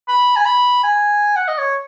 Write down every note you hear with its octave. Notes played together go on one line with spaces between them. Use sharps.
B5
G#5
B5
G#5
F#5
D#5
C#5